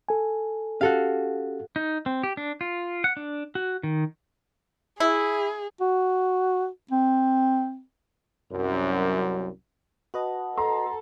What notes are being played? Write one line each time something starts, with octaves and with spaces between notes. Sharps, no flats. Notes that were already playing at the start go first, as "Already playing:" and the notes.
A4 G#5
C#4 F#4 G4 A4 F5
D#4
C4
G4
D4
F4
F#5
D4
F#4
D#3
E4 G#4
F#4
C4
C2 F#2
F#4 B4 D#5 F#5 A5
A4 A#5 C6